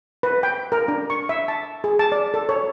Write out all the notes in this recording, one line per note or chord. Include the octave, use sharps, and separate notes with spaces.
B4
G5
A#4
D4
C#6
E5
A5
G#4
A5
D5
A4
C#5